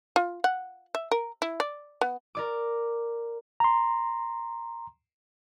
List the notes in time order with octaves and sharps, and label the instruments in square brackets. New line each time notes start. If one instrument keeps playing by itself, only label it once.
[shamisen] F4
F#5
E5
A#4
E4
D5
B3
[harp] A#4 D5 D6
[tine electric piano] A#5 C6